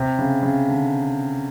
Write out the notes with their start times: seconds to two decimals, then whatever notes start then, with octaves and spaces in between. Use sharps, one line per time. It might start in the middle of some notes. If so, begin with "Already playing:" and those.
Already playing: C3
0.19 C#3
0.43 C#3
0.68 D3